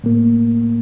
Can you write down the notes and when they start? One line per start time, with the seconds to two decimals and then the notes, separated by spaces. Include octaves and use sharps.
0.04 A2 A#3